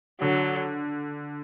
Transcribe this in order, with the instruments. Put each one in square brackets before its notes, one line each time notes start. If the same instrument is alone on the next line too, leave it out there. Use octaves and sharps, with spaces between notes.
[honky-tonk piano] D3 [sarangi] F#3